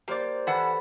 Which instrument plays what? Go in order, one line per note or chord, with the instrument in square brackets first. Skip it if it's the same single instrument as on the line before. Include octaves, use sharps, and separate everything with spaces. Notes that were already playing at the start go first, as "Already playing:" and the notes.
[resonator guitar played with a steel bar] A#3 [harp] G4 C5 D5
[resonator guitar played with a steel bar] E3 F#5 [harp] A4 B4